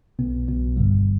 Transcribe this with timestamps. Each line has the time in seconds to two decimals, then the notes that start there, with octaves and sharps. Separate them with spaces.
0.19 B1 B2 B3
0.48 B1 B2 B3
0.76 G1 G2 D3 G3